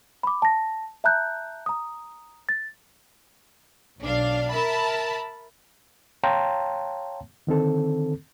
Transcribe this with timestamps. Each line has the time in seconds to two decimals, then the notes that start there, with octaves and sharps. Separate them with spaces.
0.23 B5 D6
0.42 A5 A#6
1.04 E5 A5 A#5 F#6 G6
1.66 A#5 D#6
2.49 A6
4.00 B1 D4 F5
4.50 A#4 E5 A5 B5
6.24 C#5 F5 G5 A5 A#5 C6
7.47 D3 D#3 C4 A4